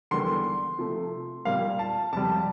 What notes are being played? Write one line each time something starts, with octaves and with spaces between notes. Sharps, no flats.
E2 D3 G3 A#3 C6
C3 F3 A3
A#2 G3 A#3 F5
A5
F2 C3 G3 A5